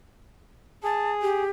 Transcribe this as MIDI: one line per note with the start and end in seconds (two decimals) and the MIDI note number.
0.84 1.44 68
0.84 1.11 81
1.22 1.50 67